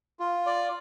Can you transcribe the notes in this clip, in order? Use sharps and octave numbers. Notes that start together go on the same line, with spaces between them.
F4
D5